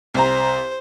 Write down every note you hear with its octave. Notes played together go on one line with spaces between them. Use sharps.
C2 C5 A#5